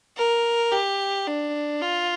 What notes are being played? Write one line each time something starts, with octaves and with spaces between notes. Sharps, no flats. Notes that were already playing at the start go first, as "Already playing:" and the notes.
A#4
G4
D4
F4